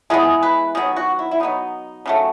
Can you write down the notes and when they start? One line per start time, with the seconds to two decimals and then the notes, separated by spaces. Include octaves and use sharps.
0.10 E3 G#3 B3 G#4
0.43 B4
0.75 D#3 F#3 B3 G#4
0.96 F#4
1.19 E4
1.31 E4
1.40 B2 F#3 B3 D#4
2.06 C#3 F#3 A3